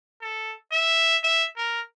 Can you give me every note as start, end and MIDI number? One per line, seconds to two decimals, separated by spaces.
0.21 0.54 69
0.72 1.17 76
1.24 1.45 76
1.57 1.81 70